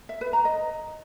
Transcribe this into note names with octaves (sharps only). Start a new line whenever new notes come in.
E5
B4
A#5
D#5